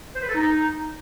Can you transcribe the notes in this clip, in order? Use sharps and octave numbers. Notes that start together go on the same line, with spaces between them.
C5
B4
A4
D#4